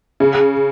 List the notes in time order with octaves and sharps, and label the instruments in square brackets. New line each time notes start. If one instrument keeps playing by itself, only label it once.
[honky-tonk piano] C#3